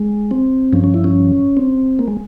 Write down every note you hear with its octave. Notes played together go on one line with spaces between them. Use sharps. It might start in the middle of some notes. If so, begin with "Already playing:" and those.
Already playing: G#3
C4
G2 F3 C#4
C#4
E4
C#4
C4
A#3
G#3